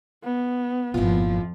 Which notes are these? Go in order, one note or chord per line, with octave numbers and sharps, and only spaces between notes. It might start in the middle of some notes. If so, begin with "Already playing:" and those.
B3
G1 F2 A#2 F3 E4 F4